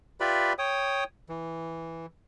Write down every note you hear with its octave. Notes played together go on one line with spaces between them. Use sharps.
F4 G4 B4 D5 E5 B5
C#5 G5 D#6
E3